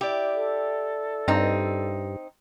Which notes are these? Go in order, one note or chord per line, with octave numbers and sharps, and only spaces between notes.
E4 G4 D5
A4
G2 C4 D#4